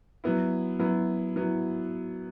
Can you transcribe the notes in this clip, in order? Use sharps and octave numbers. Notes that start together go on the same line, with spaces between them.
F#3 B3 E4
F#3 B3 E4
F#3 B3 E4